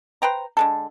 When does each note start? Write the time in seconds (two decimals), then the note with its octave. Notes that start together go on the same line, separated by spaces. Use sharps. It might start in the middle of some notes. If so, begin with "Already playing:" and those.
0.22 B4 C5 G5 A#5
0.57 D3 G#3 A4